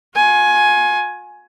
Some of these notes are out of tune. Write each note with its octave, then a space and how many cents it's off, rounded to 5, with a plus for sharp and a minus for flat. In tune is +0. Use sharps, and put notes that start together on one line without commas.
F4 +45 G#5 +10